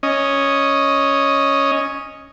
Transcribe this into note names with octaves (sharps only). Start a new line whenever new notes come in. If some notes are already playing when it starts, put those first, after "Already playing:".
C#4 D#5